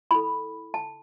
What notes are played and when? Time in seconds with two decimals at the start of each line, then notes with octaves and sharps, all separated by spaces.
0.11 E4 A4 B5
0.74 A5